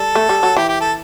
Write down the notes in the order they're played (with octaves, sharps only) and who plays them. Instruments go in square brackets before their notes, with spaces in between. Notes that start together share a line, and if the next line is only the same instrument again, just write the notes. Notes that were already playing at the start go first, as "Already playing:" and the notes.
Already playing: [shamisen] G3 [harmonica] A4
[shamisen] A3
G3
F#3
[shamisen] E3 [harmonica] G4
[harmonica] G4
A4